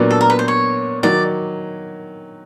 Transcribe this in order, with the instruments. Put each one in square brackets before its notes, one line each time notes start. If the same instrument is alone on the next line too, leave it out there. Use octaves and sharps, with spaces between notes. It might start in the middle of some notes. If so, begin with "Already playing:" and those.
Already playing: [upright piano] A#2 F#3 B3 D4
[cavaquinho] A4
A#4
B4
C5
C#5
[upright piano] D#3 F#3 [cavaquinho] D5